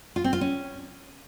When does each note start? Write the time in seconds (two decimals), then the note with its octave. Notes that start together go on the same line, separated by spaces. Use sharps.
0.16 F4
0.24 C4
0.33 F4
0.41 C#4